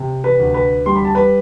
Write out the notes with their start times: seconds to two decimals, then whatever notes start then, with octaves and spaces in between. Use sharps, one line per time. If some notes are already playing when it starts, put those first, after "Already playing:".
Already playing: C3
0.24 B4 B5
0.40 D2
0.54 B4 B5
0.86 G3 C6
0.96 B5
1.05 A5
1.15 B4 B5